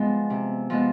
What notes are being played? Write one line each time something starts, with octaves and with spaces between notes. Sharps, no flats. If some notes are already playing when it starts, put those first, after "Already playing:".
Already playing: F3 G#3 B3
C3
F3 G#3 B3